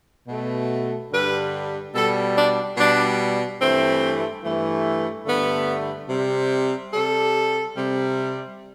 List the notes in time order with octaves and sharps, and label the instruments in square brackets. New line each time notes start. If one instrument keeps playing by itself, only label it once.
[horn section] B2 A3
G2 D3 G3 B4
B2 G3 A4
D4
B2 G3 D4
G2 E3 A3 C4
G2 E3 A3
G2 D3 A3 B3
C3 G3
C3 G3 A4
C3 G3